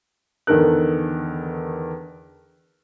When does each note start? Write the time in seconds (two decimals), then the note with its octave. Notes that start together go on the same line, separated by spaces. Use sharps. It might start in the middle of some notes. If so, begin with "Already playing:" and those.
0.47 E2 D3 D#3 A4 A#4 F#6